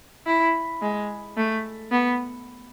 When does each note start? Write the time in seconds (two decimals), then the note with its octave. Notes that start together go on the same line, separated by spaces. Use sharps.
0.26 E4
0.82 G#3
1.37 A3
1.91 B3